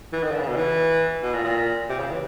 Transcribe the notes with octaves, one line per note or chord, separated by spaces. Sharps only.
E3
D#3
D3
C#3
B2
E3
B2
A#2
A#2
C3
C#3
E3